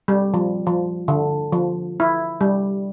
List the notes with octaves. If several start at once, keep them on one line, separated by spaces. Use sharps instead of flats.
G3
F3
F3
D3
F3
E4
G3